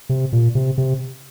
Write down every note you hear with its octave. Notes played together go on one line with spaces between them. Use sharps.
C3
A#2
C3
C3